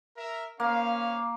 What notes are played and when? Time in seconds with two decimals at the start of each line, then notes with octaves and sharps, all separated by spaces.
0.17 A#4 E5
0.60 A#3 C#4 C5 F5